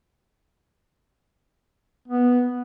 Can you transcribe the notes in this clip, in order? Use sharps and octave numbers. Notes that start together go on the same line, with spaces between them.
B3